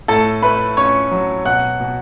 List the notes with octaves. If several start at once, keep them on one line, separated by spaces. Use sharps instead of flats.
A2 A4 A5
A3 B4 B5
C#4 C#5 C#6
F#3
B2 F#5 F#6
B2